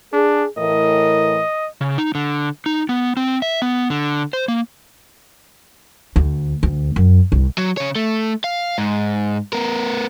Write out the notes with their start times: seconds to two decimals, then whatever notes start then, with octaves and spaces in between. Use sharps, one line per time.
0.13 D4 G#4
0.58 A2 E3 A#4 D#5
1.81 C#3
1.98 D#4
2.15 D3
2.66 D#4
2.89 B3
3.17 C4
3.42 E5
3.62 B3
3.90 D3
4.33 C5
4.48 A#3
6.16 D2
6.63 D2
6.96 F#2
7.32 C2
7.58 F#3
7.77 C#3 C#5
7.95 A3
8.44 F5
8.78 G#2
9.53 B3 A#4